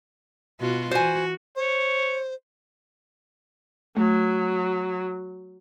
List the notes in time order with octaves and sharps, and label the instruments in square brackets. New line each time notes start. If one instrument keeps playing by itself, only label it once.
[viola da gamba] B2 F4 F#4
[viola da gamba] E3 F#4 [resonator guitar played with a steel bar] C5 G#5
[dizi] C5 [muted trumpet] C#5
[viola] F#3 [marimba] A3